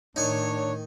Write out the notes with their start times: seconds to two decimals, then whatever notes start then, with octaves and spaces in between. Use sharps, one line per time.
0.16 A2 D#3 D4 D#4 C#5 G#5 C#6